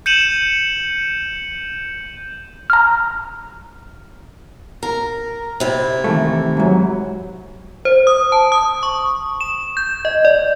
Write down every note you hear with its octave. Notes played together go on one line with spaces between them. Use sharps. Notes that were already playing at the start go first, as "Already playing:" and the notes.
G6 C#7 D#7 E7 F#7
A#5 F6
A#4
C3 E4
D#3 E3 A3
G#2 F#3
C5
D#6
A5
D#6
C#6
E7
G6
D#5
D5